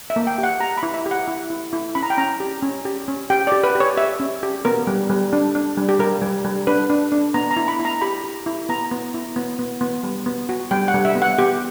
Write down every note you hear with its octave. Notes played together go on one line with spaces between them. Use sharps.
E5
A#3
G5
G4
F#5
G4 A#5
B5
E4
E5
G4
F#5
E4
E4
E4
C#4 B5
A#5
G5
C#4 A#5
G4
C#4
G4
C#4
G4 G5
G4 D5
B4
G4
C#5
G4 E5
C#4
G4
B3 A#4
G3
G3
D4
D4
G3
G4
G3 A#4
G3
G3
D4 B4
D4
D4
B3 A#5
A#5
E4
B5
E4
A#5
G4 B5
G4
E4
B3 A#5
B3
E4
B3
B3
B3
G3
B3
F#4
G3 G5
F#5
G3
E5
B3
F#5
B3 G4